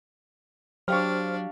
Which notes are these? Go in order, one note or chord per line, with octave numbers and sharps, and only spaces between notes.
F#3 D4 G4 C5 F5 C#6 F6